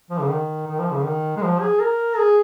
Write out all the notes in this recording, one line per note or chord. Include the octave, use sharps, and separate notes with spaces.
F3
C#3
D#3
D#3
F3
C#3
D#3
G#3
F3
G#4
A#4
G#4